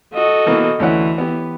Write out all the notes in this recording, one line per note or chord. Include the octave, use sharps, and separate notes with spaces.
F#4 A4 D#5
B2 E3 A#3
D2 E3 C#4 F#5
B3 G4